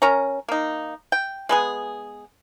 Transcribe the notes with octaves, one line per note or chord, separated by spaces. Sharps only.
C#4 A#4 C#5 A#5
A#3 D#4
G5
G#3 B3 G#4